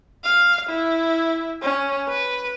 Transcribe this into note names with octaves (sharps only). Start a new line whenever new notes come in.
F5
E4
C#4
B4